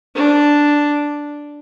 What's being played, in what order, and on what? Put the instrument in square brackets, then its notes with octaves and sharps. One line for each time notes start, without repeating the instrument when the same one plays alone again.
[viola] D4